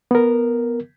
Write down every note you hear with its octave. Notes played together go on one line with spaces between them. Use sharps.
B3 A#4